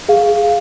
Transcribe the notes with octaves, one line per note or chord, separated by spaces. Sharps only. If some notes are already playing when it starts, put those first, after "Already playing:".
G#4 F5